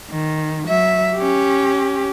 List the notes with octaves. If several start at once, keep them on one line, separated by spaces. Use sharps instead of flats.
D#3
F#3 E5
C#4 G4